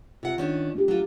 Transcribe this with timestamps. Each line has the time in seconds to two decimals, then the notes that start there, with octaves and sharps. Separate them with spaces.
0.23 C3 F4 F#5
0.38 D#3 C#4 D4
0.75 A3 D4 G4
0.88 F#3 F4